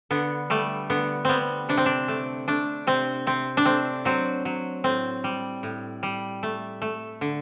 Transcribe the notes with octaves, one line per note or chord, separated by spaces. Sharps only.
D3 B3
G3 A3
D3 B3
G3 B3 C4
C3 D4
C4
D4
A3
A3 D4
C3 C4
C3 C4
D4
A3 C4
F#3 C4
F#3
A2 C4
G3
A2
G3
A3
A3
D3